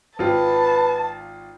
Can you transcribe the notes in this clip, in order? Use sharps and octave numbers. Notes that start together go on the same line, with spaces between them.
G#1 F4 G4 B4 A5